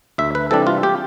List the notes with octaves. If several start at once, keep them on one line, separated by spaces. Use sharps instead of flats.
D2 E5
B4
C3 E3 G3 D4 A4
F4
G4